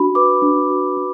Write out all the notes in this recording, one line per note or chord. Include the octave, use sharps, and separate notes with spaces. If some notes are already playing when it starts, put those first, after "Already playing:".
Already playing: D4 F#4 B5
B4 D6
D4
F#4
D4